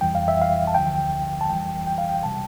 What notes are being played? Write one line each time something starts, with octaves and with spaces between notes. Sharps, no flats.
F2 E3 G3 G5
F5
E5
F5
A5
D2 D3 F3 G5
A5
G1 F2 E3 G3 G5
G5
F5
G5
C3 G3 A5